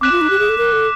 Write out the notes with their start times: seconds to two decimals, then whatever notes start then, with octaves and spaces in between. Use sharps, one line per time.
0.01 C4 D6 F#6 B6 E7
0.12 F4
0.21 D#4
0.30 G4
0.39 G#4
0.49 A4
0.58 A#4
0.73 A4